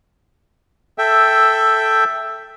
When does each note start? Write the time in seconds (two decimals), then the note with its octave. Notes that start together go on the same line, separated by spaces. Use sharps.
0.98 A4 E5 G5